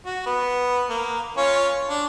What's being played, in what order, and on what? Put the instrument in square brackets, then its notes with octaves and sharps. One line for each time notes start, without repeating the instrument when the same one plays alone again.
[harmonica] F#4
B3
A#3
C#4 F4 C#5
D4